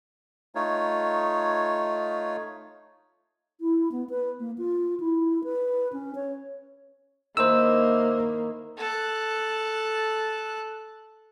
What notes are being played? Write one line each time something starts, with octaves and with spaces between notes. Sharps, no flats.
A3 D#4 F4 C#5
E4
B3
B4
A#3
F4
E4
B4
C#4
C#5
D#3 A#3 E4 C5 E6
A4 F#6